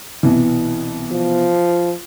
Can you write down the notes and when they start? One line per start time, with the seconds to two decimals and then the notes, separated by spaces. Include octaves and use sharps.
0.23 C2 B2 E3
1.12 F3